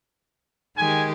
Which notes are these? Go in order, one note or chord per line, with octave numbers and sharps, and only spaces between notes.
D#3 G#3 G4 G#5